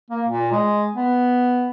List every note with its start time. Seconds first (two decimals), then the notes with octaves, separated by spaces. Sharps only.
0.10 A#3
0.28 A#2
0.52 G#3
0.96 B3